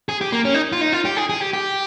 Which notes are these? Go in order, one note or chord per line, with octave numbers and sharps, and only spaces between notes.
G#4
G4
A#3
C#4
D#4
F4
D#4
F4
G4
G#4
G#4
G4
G4